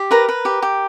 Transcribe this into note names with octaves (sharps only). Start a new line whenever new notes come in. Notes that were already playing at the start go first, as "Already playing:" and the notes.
Already playing: G4
A#4 B4 A#5
B4
G4
G4